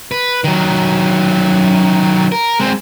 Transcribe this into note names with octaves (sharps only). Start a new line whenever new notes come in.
B4
D#3 F#3
A#4
G#3 C4